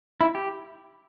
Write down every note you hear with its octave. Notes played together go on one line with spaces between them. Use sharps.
E4
G4